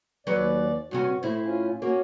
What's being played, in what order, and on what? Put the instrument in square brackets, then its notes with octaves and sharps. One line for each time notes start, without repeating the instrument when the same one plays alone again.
[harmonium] D#2 D5 [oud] F#3 B4 C#5
[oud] G2 C3 C#4 [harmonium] F#4
[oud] A2 E4 [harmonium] C5
[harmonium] C#4 F4
[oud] A#3 [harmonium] C#4 F#4 C#5